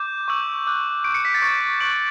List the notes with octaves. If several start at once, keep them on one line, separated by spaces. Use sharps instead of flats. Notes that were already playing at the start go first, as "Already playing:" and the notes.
Already playing: D6 G6
C#6 E6 G6
D6 F#6
C#6 E6 G6 D7
C#7
B6
A6 C#7
C#6 G6
C#6 F#6 D7 F#7